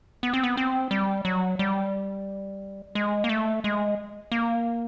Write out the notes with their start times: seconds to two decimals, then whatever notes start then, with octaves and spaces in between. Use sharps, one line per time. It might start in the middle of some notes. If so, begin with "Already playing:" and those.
0.23 B3
0.34 C4
0.44 B3
0.57 C4
0.91 G3
1.25 F#3
1.59 G3
2.95 G#3
3.24 A#3
3.29 A3
3.64 G#3
4.32 A#3